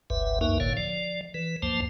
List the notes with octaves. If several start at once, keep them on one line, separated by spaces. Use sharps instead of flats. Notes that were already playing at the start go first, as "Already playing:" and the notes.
F#1 C2 G2 B4 E5
C#2 F#2 A#3 D#4 A#4 E5
G1 A2 D3 C#5 F5
F3 D5
E3 B4
D2 G2 F3 A#3 C5 A5